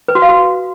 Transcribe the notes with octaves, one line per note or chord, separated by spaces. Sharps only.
B4
F#4
F5
F#4